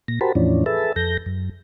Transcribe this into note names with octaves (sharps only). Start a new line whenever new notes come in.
A#2 A#6
F#4 G4 A#4 C5 A5 B5
E2 A2 E3 F3 C#4 D4
G#4 A4 B4 E5 A5
F2 A4 G6 A#6
F#2